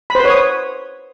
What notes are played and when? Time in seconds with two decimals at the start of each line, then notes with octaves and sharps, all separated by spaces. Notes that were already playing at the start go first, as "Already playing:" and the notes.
0.10 B5
0.15 C5
0.20 B4
0.25 C#5
0.30 D#6